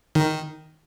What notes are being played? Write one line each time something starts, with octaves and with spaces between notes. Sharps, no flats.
D#3